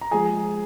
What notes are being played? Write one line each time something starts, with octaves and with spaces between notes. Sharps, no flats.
A#5
F3 G#3 G#4 G#5